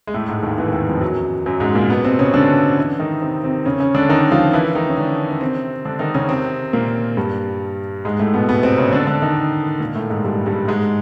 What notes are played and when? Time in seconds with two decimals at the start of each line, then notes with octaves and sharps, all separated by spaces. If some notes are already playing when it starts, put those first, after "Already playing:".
0.07 G#3
0.14 A2 A3
0.28 G#2 G#3
0.43 D#2 D#3
0.58 E2 E3
0.68 D#3
0.73 E2 E3
0.87 F2 F3
1.01 F#2 F#3
1.46 F#2 F#3
1.60 G#2 G#3
1.75 A#2 A#3
1.90 B2 B3
2.04 C3 C4
2.19 C#3 C#4
2.34 D3 D4
2.77 E3 E4
2.99 D#3 D#4
3.21 C3 C4
3.44 C3 C4
3.65 C#3 C#4
3.80 C#3 C#4
3.95 D3 D4
4.09 D#3 D#4
4.31 F3 F4
4.53 E3 E4
4.75 D#3 D#4
4.89 C#4
4.97 D3 D4
5.30 C#4
5.41 C3 C4
5.85 D3 D4
5.99 D#3 D#4
6.14 C#3 C#4
6.29 C3 C4
6.73 A#2 A#3
7.17 G2 G3
8.05 G#2 G#3
8.19 A2 A3
8.34 B2 B3
8.49 B2 B3
8.63 C3 C4
8.78 C#3 C#4
8.92 D3 D4
9.07 D3 D4
9.22 D#3 D#4
9.80 A#2 A#3
9.95 A2 A3
10.10 G#2 G#3
10.24 G2 G3
10.46 G2 G3
10.68 G#2 G#3